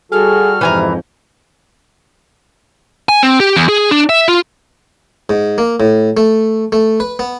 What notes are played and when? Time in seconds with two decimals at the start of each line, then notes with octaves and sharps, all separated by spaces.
0.12 G3 F#4 G#4 A4 F6
0.61 F2 G#2 C3 E3 F3 G#5 A#5
3.09 G#5
3.23 C4
3.40 G4
3.56 E2
3.69 G#4
3.91 D4
4.09 E5
4.28 F4
5.30 G#2
5.58 A#3
5.80 A2
6.17 A3
6.72 A3
7.00 B4
7.19 B3